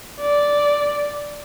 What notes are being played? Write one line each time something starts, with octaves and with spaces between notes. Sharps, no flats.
D5